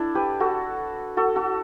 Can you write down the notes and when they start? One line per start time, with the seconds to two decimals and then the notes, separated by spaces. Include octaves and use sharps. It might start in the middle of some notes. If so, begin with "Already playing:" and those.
Already playing: D4 E4 A4
0.15 G4 B4
0.40 F#4 A4
1.17 F#4 A4
1.36 F#4 A4